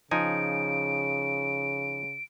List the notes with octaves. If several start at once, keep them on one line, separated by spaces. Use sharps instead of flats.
C#3 F3 D#4 G#5 D7